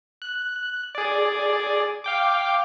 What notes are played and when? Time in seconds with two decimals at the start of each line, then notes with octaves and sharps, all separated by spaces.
0.22 F#6
0.95 G#4 D5
2.04 F5 G5 D6